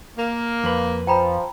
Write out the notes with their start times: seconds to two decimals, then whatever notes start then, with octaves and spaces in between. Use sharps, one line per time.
0.18 A#3
0.64 F2 B4
1.07 F3 G5 A#5 B5